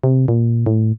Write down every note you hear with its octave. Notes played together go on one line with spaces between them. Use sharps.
C3
A#2
A2